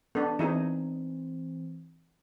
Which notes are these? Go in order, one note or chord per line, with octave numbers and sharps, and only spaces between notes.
B3 D4 A4
E3 C4 D#4 E4 G#4